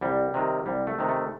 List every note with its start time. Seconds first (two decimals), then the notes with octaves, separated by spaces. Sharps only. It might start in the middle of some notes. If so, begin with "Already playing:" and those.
0.01 C2 G3
0.34 C3 D#3
0.66 C2 G3
0.87 A3
0.99 C3 D#3
1.09 A3